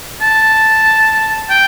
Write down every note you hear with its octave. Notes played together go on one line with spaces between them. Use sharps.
A5
G5